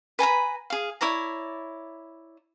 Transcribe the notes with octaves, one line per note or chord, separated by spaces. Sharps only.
B4 G#5 A#5 B5
G#4 F5
E4 C#5 D5 A#5